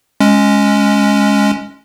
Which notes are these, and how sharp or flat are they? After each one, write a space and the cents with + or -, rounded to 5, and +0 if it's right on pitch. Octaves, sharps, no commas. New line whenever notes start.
G#3 +0 C#4 +0